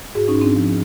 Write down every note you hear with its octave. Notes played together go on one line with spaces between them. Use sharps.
G#2 F#4 G#4
C#4 D#4
G#2
C4 D4
F3